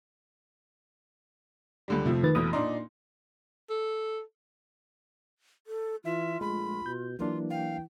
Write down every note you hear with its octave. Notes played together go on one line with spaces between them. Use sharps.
C#2 D3 G3
F2 C3 F3 A3
D#3 B4 A6
F1 B2 E3 D#6
A#2 D4 D#4 C6
A4
A4
E3 F4 E5
A#1 G#3 A3 B5
B2 G6
E3 F#3 A#3 D4 F4
F5 G5